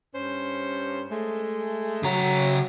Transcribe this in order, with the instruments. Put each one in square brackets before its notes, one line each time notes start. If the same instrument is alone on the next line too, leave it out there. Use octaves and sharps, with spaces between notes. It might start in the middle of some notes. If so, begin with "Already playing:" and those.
[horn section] G2 C#4 C5
G#3 A3
[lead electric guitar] C#3 A#5 [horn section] F#3